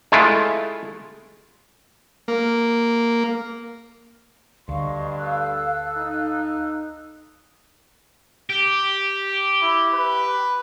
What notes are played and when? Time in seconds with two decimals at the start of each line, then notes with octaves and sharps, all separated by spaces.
0.12 G#3 A3 E4 F4
2.28 A#3
4.69 D2 G2 D#5 F5 C6 C#6
5.18 A4 E6 F#6
5.97 D#4
8.50 G4
9.62 E4
9.93 B4